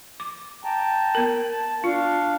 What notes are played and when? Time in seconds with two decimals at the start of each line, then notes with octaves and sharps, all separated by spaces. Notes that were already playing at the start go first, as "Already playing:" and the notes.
0.20 D6
0.64 G5 A5 A#5
1.15 B3 A#4
1.51 A5
1.84 D4 F4 F5